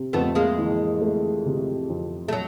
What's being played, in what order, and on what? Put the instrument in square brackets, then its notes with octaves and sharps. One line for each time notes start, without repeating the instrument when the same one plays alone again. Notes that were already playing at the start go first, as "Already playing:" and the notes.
Already playing: [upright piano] C3
[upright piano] F2 [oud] A3 B3
[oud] G#3 A#3
[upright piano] E3
A3
C3
F2
[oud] A3
F#3